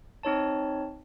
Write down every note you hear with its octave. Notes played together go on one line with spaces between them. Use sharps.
C4 D#4 C#5 A5